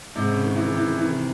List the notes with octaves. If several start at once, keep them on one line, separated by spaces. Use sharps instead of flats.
G#2 C3
C#3
D#3
E3
D#3
E3
D#3
C3 E3
D#3